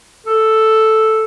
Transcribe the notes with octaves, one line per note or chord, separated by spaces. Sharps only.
A4